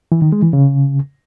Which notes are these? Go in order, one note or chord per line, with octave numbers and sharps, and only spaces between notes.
E3
D#3
G#3
E3
C#3